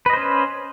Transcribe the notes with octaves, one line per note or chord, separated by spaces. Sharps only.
C#4 B4 C5 D#5